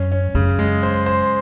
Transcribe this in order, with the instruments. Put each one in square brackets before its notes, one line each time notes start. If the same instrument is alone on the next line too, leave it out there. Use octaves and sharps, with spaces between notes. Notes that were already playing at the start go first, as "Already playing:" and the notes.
Already playing: [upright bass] F#2 [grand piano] C#4
[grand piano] C#4
[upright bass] F#2 [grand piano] C#3
[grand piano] G#3
C5
C5